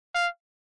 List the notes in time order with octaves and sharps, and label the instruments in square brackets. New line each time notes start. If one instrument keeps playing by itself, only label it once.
[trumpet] F5